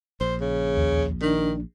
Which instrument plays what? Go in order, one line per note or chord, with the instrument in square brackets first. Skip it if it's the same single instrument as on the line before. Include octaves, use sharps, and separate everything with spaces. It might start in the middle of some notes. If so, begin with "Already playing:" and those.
[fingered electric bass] A#1 [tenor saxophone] C5
[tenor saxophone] C#3
[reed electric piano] D#2
[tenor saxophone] D#3 [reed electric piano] D4